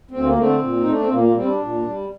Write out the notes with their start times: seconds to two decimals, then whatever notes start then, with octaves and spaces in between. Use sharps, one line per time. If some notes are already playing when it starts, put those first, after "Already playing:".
0.11 D2 C4
0.25 A#3
0.37 D3 A3 C4
0.61 A#2
0.81 A3 D#4
0.91 D4
1.00 C4
1.11 A#2 A#3
1.24 A#3
1.36 G3 C4
1.47 D4
1.61 A#2
1.85 G3